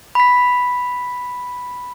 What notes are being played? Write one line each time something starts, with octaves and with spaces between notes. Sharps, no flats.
B5 B6